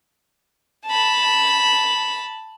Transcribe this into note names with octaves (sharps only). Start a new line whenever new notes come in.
A5 B5